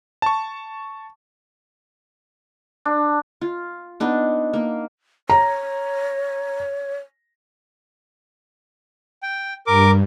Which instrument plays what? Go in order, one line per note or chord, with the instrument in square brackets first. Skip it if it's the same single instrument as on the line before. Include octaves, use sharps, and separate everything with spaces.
[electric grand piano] A5 C#6
[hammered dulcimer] D4
[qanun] F4
B3 D4 D#4
A#3
[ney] C#5 [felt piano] A#5
[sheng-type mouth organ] G5
[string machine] G2 [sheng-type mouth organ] A#4 D6